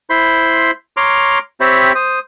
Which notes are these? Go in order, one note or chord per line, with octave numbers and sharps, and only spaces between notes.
E4 C5 B5 C6
C#5 A#5 C6 D6 F6
C4 G4 C5 C#5 E5 B5
C5 D#6